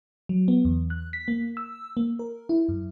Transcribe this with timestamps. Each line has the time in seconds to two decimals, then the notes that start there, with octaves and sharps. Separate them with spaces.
0.29 F#3
0.48 B3
0.65 E2
0.90 F#6
1.13 B6
1.28 A#3
1.57 E6
1.97 A#3
2.19 A#4
2.49 E4
2.69 F#2